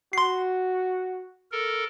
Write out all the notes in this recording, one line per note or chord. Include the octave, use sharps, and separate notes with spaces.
F#4 C6 C7
A4 A#4